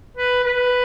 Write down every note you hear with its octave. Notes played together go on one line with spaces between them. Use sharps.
B4
B4